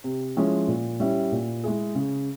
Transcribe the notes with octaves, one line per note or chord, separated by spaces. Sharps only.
C3
F3 G#3 C#4 E4
A#2
G3 C#4 E4
A#2
G#3 E4 G#4
C#3